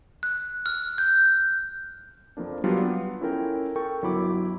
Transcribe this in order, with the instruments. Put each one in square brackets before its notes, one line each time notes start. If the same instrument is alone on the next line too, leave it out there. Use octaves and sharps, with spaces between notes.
[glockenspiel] F#6
F6
G6
[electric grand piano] F2 F3 A#3 D4
F#3 G3 B3 D4 F4
B3 F4
C#4 E4 F4 A4 A#4 G5
A4 A#4 G5 C#6
G1 F#3 E4 B5 D6